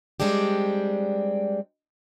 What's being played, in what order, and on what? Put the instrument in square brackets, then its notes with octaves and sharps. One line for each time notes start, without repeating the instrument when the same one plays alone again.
[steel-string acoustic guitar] G3 G#3 C4 D4 G4